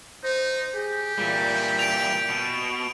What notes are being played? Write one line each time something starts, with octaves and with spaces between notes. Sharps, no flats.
D#4 C5
G4 G#4
A#2 E3 G3
D7 F7
B2